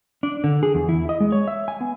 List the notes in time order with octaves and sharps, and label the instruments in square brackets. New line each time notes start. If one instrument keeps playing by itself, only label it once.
[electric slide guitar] D4
D3
G#4
E2
E4
D#5
G#3
C#5
E5
G#5
B3